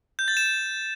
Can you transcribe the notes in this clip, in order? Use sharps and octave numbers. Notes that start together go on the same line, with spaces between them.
G6
A6
E7